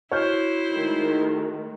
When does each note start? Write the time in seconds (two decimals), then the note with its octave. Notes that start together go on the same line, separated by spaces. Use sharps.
0.12 E4 F#4 C5 C#5 F6 G6
0.74 D#3 G#3 A3